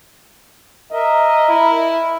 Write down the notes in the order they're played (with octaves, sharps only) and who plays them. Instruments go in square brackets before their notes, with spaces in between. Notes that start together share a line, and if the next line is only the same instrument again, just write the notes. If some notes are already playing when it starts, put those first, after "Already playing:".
[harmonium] A#4 E5 [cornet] D#5
[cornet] E4